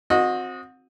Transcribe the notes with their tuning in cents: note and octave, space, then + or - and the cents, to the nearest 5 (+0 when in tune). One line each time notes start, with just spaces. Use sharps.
C4 +10 F#4 -30 D#5 +0